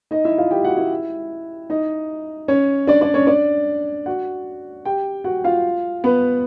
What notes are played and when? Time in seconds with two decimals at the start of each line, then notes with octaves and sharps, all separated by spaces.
0.11 D#4 D#5
0.25 E4 E5
0.38 F4 F5
0.51 G4 G5
0.64 F#4 F#5
0.77 E4 E5
1.70 D#4 D#5
2.48 C#4 C#5
2.87 D4 D5
3.01 D4 D5
3.14 C#4 C#5
3.27 D4 D5
4.06 F#4 F#5
4.85 G4 G5
5.24 F#4 F#5
5.44 F4 F5
6.04 B3 B4